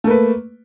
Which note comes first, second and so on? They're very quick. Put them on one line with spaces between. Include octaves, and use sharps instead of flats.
A3 A#3 B4